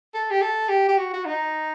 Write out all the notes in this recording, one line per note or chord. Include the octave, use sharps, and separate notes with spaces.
A4
G4
A4
G4
G4
F#4
F#4
D#4